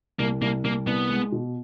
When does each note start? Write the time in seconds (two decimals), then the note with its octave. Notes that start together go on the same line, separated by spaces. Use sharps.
0.19 C2 A#3
0.42 C2 A#3
0.64 C2 A#3
0.87 C2 B3
1.09 G#3
1.32 B2